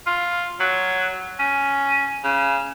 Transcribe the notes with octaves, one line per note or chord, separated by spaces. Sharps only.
F4
F#3
C#4
C#3